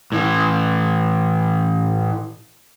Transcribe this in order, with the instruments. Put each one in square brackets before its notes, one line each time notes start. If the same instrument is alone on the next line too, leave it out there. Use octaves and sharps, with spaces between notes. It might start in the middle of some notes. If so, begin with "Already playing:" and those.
[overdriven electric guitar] A2 E3